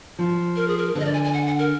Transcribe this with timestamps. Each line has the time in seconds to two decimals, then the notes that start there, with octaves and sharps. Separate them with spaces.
0.19 F3
0.56 A#4
0.68 G#4
0.77 A#4
0.95 D3 B4
1.00 D#5
1.05 D5
1.14 G#5
1.24 G#5
1.34 F#5
1.46 F#5
1.59 A#4